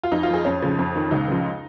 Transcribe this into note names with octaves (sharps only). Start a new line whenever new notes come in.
F4
F2 D#4
F4
F3 G#4
F2 C#4
C#3 F3
F2
D#3
C#2 D#4
C#3 F3